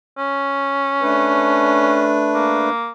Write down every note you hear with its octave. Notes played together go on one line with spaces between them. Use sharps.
C#4
A3 D4 B4
A#3